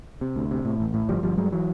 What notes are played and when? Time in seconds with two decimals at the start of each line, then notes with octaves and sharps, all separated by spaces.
0.21 C3
0.36 D2
0.51 C3
0.65 A2
0.80 A1
0.94 A2
1.09 G1 F3 G3
1.23 G1 F3 G3
1.37 G2 F#3 G#3
1.52 E3 F#3